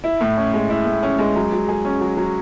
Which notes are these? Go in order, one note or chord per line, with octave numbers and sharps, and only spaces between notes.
E4
A2
C#4
G#3
E4
A2
C#4
G#3
F#3
F#3
G#4
C#4
F#3
F#3